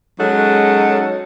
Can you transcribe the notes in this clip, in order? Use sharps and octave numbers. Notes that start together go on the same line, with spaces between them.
F#3 G#3 C#4 D#4 A4 F#5